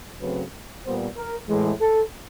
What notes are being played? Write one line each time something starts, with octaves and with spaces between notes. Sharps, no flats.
C#3 F#3 A3 C4 B4
A#2 G3 B3 C5
A#4
A2 E3 G#3
A4